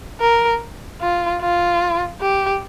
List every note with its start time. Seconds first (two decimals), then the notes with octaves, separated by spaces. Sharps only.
0.20 A#4
1.01 F4
1.41 F4
2.21 G4